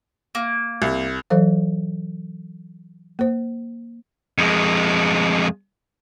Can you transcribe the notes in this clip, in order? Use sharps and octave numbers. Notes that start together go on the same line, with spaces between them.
A#3
C2
E3 F#3 A4 C5 F5
A#3 C5
F2 G#3